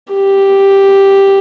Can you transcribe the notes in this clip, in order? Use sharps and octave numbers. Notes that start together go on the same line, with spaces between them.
G4